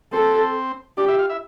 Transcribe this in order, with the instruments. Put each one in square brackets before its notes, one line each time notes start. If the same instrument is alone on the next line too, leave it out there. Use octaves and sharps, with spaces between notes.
[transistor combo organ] C4 C5 [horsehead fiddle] A4
[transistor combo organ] D4 D5 [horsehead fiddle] G4
[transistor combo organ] E4 E5
F4 F5
E4 E5